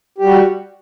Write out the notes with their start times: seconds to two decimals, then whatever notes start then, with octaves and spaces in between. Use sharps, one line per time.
0.18 G4
0.22 G3
0.25 F#4